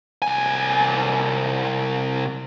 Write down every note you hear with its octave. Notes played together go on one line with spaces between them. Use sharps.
C2 G#5